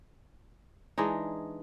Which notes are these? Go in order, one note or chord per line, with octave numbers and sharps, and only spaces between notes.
E3 G#3 D4 D#4